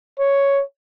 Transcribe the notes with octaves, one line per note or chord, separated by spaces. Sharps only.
C#5